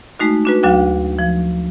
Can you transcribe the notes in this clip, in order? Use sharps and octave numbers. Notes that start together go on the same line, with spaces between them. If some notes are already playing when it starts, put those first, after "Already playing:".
G#3 A3 D#4 F#4
D4 F#4 B4
D2 F#3 D4 F#4 F5 G5
F3